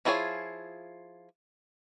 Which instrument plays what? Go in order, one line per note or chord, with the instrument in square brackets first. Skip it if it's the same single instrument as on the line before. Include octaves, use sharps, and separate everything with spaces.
[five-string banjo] F3 E4 F4 G#4 C#5